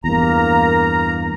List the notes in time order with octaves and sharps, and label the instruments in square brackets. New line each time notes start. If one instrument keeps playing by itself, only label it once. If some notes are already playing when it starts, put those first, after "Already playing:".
[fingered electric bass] E2 G2 [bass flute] A#3 [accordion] A#5